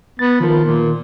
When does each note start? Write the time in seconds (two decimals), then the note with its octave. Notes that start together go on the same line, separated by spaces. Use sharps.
0.19 B3 A6
0.40 D#3 F3 A#4
0.64 A#2